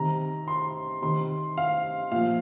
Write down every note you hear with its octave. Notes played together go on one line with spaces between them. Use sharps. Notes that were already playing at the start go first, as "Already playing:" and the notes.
Already playing: C3 D#3 A#5
C6
C3 D#3 C6
F5
A#2 F3 F5